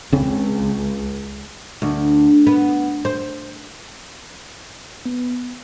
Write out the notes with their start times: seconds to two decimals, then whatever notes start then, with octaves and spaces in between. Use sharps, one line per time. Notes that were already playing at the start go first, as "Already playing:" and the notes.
0.12 C#2 C#3 C4 C#4
1.82 D2
2.47 B3
3.05 C5
5.05 B3